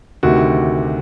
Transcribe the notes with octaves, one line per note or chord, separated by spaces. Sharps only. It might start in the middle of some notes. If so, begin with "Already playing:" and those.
D2 C3 D#3 F#4